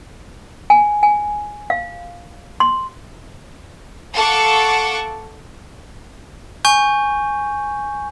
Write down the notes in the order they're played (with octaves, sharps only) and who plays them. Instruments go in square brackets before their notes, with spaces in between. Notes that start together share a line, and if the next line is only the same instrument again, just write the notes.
[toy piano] G#5
G#5
F5
C6
[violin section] A4 F5 F#5 A5 C#6 D6
[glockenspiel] G#5 C#6 G6